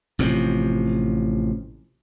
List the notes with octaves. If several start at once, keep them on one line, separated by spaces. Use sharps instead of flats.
A1 C3 D#3 F3